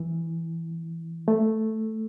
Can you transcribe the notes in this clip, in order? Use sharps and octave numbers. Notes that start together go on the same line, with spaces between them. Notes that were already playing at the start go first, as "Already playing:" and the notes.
Already playing: E3
A3